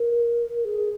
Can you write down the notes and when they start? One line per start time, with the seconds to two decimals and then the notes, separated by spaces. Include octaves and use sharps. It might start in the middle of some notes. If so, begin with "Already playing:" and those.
Already playing: A#4
0.65 G#4